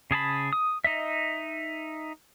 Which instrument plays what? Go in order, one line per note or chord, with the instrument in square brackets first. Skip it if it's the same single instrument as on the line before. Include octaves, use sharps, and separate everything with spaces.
[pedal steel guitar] C#3 G#4 A5 B5
D#6
D#4 D#5 E5